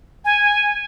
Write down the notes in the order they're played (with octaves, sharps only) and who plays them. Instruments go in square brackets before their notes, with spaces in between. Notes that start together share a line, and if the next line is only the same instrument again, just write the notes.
[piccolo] G#5